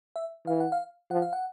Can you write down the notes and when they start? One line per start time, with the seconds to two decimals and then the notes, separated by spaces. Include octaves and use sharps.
0.16 E5
0.47 E3 F5
0.60 F#5
0.72 F5
1.11 F3 F#5
1.22 F5
1.33 F#5